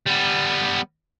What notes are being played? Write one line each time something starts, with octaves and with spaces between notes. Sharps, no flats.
G3 B3